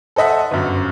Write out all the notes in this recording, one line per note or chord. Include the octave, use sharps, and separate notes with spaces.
A4 C5 D#5 E5 F#5
G1 F#2